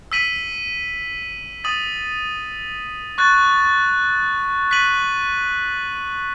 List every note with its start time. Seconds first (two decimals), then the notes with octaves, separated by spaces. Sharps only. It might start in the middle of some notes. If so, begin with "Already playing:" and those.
0.12 E6 B6 D#7 F#7
1.64 D#6 A6 D#7 F#7
3.18 C#6 F#6 A6
4.71 F#6 B6 D#7 F#7